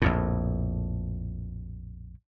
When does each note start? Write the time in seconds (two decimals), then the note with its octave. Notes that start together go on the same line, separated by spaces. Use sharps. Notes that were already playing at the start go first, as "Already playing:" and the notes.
0.02 A#1 F2 A2